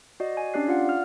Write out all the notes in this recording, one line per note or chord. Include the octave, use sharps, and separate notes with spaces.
F#4 D5 D#5
G#5
C#4 D4 G4 D5 F#6 C7
F4 F5 F#5
D5 F6